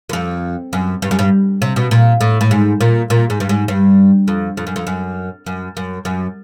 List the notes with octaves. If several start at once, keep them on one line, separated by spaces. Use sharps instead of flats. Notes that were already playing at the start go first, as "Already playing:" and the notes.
F#2
F2
F#2
G2
F#2
G2
C3
B2
A#2
A2
A2
G#2
A#2
A#2
G#2
G2
G#2
G2
F2
F2
F#2
F2
F#2
F#2
F#2
F#2